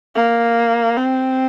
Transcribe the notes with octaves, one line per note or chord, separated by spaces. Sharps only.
A#3
C4